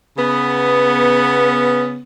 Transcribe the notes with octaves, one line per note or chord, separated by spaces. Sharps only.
C#3 B3